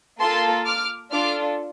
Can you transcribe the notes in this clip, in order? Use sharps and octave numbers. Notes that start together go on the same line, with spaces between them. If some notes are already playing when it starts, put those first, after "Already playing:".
A#3 F4 A4 A5 C6
D6 F6
D4 F4 A4 D6 F6